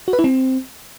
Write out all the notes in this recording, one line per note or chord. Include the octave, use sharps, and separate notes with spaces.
F#4
B4
E4
C4